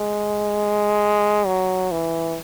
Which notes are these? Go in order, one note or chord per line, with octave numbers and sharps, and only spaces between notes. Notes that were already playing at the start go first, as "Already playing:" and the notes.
Already playing: G#3
F#3
E3